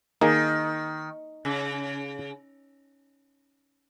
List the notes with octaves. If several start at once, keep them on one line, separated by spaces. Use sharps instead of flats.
D#3 A#3 D#4 G#4
C#3